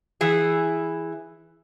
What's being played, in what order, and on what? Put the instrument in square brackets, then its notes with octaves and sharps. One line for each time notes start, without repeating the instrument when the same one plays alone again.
[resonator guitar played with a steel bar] E3 E4 G#4